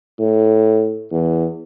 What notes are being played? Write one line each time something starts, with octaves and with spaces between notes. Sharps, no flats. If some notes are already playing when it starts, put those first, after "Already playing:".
A2
E2